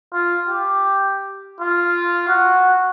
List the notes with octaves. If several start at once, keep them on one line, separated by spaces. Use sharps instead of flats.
F4
G4
F4
F#4